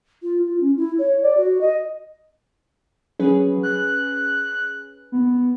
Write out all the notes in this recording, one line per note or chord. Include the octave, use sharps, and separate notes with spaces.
F4
F4
C#4
E4
C#5
D5
F#4
D#5
F#3 C#4 G#4 B4
F#6
B3